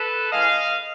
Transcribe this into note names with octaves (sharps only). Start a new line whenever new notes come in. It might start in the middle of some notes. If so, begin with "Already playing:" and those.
Already playing: A4 B4
E3 G#3 C#4 D#5 F5